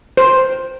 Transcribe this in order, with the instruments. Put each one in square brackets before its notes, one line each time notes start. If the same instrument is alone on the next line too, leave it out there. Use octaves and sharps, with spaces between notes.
[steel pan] C5